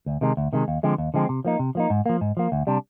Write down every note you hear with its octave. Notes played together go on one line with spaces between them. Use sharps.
D2
C3 D#3 G#3
D2
C3 D#3 G#3
D#2
D3 F3 G#3 C4
D#2
D3 F3 G#3 C4
C3
F3 A#3 D#4
C3
F3 A#3 D#4
G#2
F3 A#3
G#2
F3 A#3
D2
C3 G3 D4